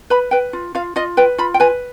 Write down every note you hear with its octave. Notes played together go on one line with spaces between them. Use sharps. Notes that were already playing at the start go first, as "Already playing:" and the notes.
B4 B5
B4 G5
F4
F4 F5
F4 D#5
B4 G5
F4 B5
G5
B4 G#5